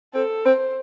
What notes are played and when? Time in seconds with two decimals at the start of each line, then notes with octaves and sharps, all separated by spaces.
0.14 C4 A4
0.45 C4 C5